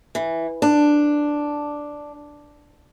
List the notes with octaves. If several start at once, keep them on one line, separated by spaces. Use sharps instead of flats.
E3
D4